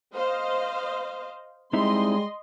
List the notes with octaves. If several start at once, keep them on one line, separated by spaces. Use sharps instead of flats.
C5 D#5 F5
G3 G#3 C4 D#4 E4 D#5 C6